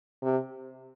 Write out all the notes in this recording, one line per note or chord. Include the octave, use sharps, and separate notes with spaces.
C3